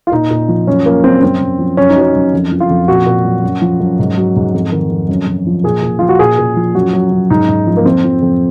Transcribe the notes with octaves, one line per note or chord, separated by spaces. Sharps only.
F4
A#2 D#4
A#2
F3
F#2 C#4
F3 A#3
F#2 C4
F#2 C4
F#2
F3
F#2 C#4
D#4
F#3 C#4
F#2
F2
F3
F4
F2
A#2 F#4
A#2
F#3
F#2
F3
F#2
G#2
F#3
G#2
F2
D#3
F2
F#2
F#2
F3
A#2 G#4
A#2
F3 F4
F#4
A#2 G#4
A#2
F3
F#2 F#4
F#3
F#2
G#2 D#4
G#2
F3
A#3
F2 C4
F3
F2